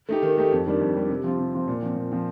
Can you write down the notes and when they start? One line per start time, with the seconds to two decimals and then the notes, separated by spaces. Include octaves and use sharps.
0.09 A3 D#4 G4
0.22 D#3
0.37 A3 D#4 G4
0.51 F2
0.66 D#3 G3 D4
0.81 F2
0.95 D#3 G3 D4
1.10 C3
1.24 F3 C4 F4
1.39 C3
1.54 F3 C4 F4
1.68 A#2
1.82 F3 C4
1.96 A#2
2.12 F3 C4